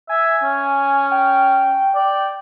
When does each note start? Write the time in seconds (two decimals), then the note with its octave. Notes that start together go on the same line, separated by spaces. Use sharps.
0.09 E5 G#5
0.43 C#4
1.12 G5
1.95 D5